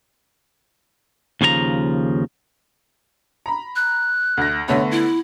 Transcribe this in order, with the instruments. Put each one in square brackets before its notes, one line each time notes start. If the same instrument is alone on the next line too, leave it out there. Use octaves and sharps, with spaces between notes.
[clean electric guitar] D#2 C#3 F3 G#4 A#5
[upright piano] A#5 B5
[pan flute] F#6
[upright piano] D2 A#6
[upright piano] D3 A3 B3 [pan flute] C#5
[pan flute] E4